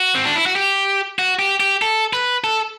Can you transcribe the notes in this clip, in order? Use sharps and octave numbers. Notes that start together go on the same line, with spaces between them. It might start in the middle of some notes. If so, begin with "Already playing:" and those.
Already playing: F#4
C4
D4
E4
F#4
G4
F#4
G4
G4
A4
B4
A4